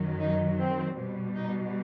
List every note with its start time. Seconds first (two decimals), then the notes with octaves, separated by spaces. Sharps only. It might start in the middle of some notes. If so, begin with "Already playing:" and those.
Already playing: F#2 D#3 F#3
0.20 D#4
0.59 C4
0.97 B2 G3
1.35 D#4